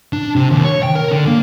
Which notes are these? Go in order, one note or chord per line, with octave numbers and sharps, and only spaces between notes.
D4
C3
D#2
C#5
G5
A#4
D3
A#3